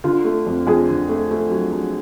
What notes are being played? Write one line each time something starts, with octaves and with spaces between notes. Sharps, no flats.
D3 F4
A3
F2
F2 G#4
D3
A3
A3
F#3
F#3